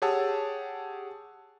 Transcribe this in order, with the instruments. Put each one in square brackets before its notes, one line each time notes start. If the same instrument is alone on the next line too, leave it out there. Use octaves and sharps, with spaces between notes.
[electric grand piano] G4 G#4 C#5 F#5 A5 E6